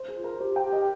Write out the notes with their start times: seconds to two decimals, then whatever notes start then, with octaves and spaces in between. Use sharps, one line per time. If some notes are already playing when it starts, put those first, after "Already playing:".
Already playing: C5
0.08 G#4
0.16 F4
0.24 A#4
0.40 G4 C5
0.56 G5
0.65 G4
0.72 D#5